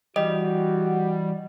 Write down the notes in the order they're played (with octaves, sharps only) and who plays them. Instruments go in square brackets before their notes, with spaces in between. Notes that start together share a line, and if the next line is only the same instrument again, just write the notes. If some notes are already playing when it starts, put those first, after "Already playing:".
[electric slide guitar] E3 G4 D5 [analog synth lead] G3 [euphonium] F#4 [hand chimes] D#5